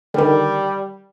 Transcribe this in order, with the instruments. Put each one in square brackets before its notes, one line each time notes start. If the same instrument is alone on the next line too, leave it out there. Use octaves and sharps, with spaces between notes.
[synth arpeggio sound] D3 D#3 [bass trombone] G3